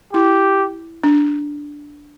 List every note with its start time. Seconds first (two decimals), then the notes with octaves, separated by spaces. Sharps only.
0.13 E4 G4
1.04 D4